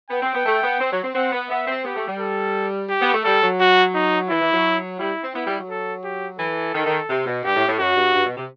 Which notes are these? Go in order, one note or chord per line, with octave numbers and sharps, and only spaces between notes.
B3 G5
C4
B3
A3
B3
C4
F#3
C4
C4 F#5
B3
B3 E5
C4
B3 G4
A3
G3
A4
G4
B3
A3
G3 A4
F#3
F#4
D#4
E3 E4
E3
F#3
G3 E4
C4
B3 E4
G3
F#3
A4
G4
E3 A4
D#3
D#3
C3
B2
G2 G4
A2
A2
F#2 F#4
G2
G2
B2
C3